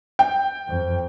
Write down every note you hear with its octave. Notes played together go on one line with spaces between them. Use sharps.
G5
F2